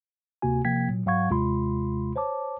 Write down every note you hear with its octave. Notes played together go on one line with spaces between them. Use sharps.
D2 C3 A#3 F#4 G#5
C3 F3 A#3 G5 G#6 B6
A#2 F#3
G#2 F#3 F5 F#5 C#6 G#6
D#2 C3 G#3 F4 B5 C6
C5 C#5 A5 D6